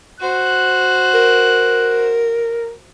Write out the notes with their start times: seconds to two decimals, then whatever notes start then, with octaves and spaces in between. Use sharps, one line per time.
0.21 F#4 C5 F#6
1.14 A#4